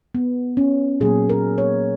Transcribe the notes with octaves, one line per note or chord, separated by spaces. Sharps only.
B3
C#4
A#2 F#3 A#3 G#4
A#4
C#5